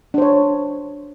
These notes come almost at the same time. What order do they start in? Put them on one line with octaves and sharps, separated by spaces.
D4 C5 C#5